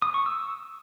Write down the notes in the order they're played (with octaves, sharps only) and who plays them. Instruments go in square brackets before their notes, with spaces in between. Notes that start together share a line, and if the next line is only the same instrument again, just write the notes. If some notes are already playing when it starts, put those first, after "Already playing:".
[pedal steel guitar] D#6
C#6
E6